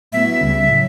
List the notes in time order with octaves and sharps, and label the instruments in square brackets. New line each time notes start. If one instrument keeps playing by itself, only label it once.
[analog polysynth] A2 F#3 B3 E4 [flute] E5
[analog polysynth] C#2 C#3 G3 C#4
A2 F#3 C#4